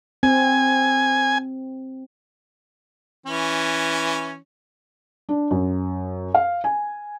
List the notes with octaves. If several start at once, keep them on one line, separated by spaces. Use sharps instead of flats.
C4 G#5
E3 C#4
D4
F#2
F5
G#5